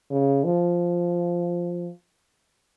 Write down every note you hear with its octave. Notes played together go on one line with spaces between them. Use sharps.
C#3
F3